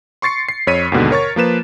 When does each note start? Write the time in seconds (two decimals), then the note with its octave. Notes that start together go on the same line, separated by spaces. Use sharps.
0.22 C6 C#6 A6 C7 C#7
0.49 C7
0.67 F2 C#5 B6 D#7
0.92 D#2 G#2 B2 D3
1.11 A#4 C#5 C#6 A6
1.36 F3 A#3 B4 E7